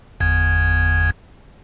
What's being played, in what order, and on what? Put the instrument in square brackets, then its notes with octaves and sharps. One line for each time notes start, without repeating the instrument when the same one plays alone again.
[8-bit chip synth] G1 E2 G#6